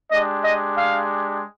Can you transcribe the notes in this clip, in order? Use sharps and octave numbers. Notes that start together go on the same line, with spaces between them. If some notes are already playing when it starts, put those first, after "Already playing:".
G#3 D4 G4 D#5
D#5
F5